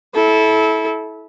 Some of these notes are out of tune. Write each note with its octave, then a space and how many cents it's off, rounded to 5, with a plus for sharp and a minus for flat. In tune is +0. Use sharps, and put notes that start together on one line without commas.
E4 -20 A4 -25